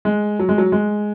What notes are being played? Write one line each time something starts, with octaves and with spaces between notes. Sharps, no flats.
G#3
F#3
G#3
F#3
G#3